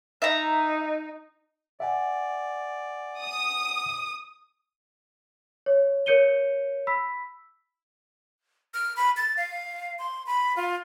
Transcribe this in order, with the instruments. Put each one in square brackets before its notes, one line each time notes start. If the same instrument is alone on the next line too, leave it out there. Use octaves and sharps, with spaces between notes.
[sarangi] D#4 [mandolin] E5 A#5
[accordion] D5 [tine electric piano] E5 F#5 G#5
[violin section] D#6
[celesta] C#5
A#4 C#5 G6 C#7 D#7 G7
B5 E6 B6
[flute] F6
B5
A6
F5
C6
B5
F4